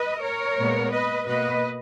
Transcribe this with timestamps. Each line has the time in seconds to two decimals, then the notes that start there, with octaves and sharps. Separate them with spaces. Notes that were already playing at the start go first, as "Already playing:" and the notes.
Already playing: B4 D#5
0.22 A#4 C#5
0.57 A#2 G#3 B3
0.92 B4 D#5
1.27 B2 A#3 B4 D#5